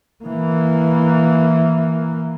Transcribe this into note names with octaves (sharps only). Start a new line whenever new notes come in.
E3 A#3